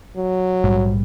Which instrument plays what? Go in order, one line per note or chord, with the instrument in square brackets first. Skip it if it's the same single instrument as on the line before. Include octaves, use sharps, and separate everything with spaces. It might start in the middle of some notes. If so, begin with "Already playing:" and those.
[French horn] F#3
[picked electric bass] A#1 G#2 G3